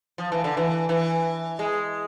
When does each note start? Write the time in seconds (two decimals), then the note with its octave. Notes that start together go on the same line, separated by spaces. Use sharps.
0.18 F3
0.32 E3
0.44 D3
0.57 E3
0.89 E3
1.59 G#3